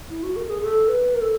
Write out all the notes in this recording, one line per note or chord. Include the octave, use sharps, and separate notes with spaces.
E4
F#4
A#4
G#4
A4
B4
A#4
A4